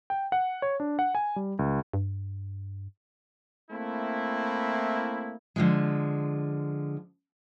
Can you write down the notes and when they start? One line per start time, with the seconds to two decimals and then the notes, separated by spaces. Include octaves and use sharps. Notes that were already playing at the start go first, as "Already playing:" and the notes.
0.10 G5
0.32 F#5
0.62 C#5
0.80 D4
0.99 F#5
1.15 G#5
1.36 G3
1.59 C#2
1.93 G2
3.71 A3 A#3 C4 E4
5.56 D3 F3 G#3